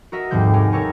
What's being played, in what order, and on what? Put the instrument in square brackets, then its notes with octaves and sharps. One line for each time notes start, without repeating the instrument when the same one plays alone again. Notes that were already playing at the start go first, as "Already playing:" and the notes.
[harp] F#4 A#4 D#5 E5
F1 D#2 G#2 C3 G3 G6
F#4 G4 A#4 G#5
A4 A#4 C#5 D#5